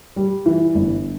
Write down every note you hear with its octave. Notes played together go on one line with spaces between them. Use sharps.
G3
E3
G1